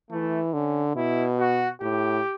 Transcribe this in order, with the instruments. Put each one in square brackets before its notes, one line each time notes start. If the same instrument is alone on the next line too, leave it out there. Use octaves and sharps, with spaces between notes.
[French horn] E3 [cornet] A3
[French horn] D3 [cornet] C#4
[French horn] B2 [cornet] E4
[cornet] F#4
[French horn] A2 [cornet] G4